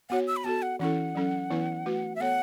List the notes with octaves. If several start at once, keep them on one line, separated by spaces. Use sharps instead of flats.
B3 F#4 C#5 F#5
E6
B5
B3 F#4 A4 A5
F#5
E3 C#4 E4 A4 F#5
F#3 C#4 A4
E3 B3 E4 B4
A3 F#4 B4
E5
B3 A4 C#5 F#5